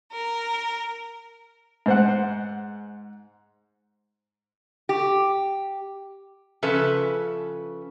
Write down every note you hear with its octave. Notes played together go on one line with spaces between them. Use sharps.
A#4
G#2 C5 F#5
G4
C#3 F3 C#4 A4 B4 E5